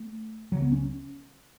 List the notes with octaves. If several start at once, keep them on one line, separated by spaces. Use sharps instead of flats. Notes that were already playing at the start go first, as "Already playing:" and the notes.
Already playing: A3
C#2 C#3 F#3
B3
C#4